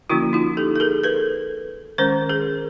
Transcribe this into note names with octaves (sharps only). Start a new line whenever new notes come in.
D3 F3 A#3 C#4 E4 F#4
D#4 F4
G4 A4
A4
G#4 A#4
A4 B4
D#3 G#3 C#4 A#4 C5
G#4 A#4